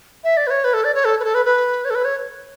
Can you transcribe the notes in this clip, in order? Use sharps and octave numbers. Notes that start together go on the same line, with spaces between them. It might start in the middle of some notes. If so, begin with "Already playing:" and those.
E5
D5
B4
C#5
B4
A4
D5
C#5
A4
B4
A4
B4
B4
C#5
A4
B4
C#5